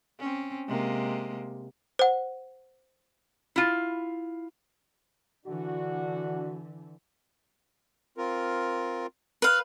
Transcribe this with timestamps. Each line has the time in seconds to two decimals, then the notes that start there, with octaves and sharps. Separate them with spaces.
0.20 C4 C#4
0.67 C3 G#3 A#3
1.99 C5 F#5
3.56 E4 F4
5.46 D3 E3 D4 F#4
8.18 C4 F4 A#4
9.42 B4 F5